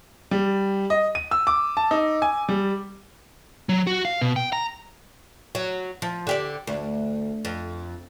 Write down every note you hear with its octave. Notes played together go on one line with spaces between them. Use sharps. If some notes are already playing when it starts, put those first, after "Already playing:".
G3
D#5
D#7
E6
D6
A5
D#4
G#5
G3
F#3
F#4
F5
B2
G5
A#5
F#3
F3
D3 G4 D5
D2
F2